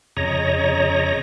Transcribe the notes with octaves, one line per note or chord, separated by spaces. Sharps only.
F2 C#3 C#5 D#5 A#5